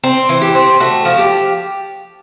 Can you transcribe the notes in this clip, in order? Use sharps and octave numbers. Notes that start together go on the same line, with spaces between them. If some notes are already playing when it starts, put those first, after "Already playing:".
C4 C5
E3
G4
C4
A3 F#4
F3
G4